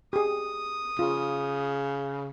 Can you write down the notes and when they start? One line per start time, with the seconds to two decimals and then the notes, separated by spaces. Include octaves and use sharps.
0.13 G4 G#4 D#6
0.99 C#3 F4